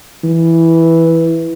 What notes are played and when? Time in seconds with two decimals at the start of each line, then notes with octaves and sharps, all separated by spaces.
0.24 E3